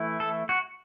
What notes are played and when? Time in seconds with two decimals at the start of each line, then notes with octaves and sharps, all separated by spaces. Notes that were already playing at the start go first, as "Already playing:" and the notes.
Already playing: E3 A3 E4
0.20 A4
0.49 F#4